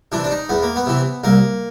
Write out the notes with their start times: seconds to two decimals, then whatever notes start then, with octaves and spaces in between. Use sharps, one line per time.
0.12 C3 E3 D4
0.24 D4
0.31 D#4
0.49 E2 B3
0.63 A#3
0.76 B3
0.87 C3 E3
1.24 C2 A#3